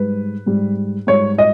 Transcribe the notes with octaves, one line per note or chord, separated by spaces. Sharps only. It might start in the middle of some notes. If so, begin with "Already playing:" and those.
Already playing: G#2 G3 B4
G#2 G3
G#2 G3 C#5
D#5